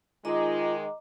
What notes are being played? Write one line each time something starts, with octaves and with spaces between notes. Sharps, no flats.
D#3 G#3 F4 D#5 A#5 D6